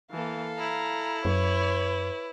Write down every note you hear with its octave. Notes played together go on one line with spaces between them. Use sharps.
E3 A#3 A4 F5
E4 A#5
F#2 B4 C#5